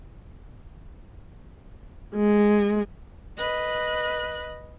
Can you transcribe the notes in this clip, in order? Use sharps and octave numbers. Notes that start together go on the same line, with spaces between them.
G#3
B4 D#5 F#6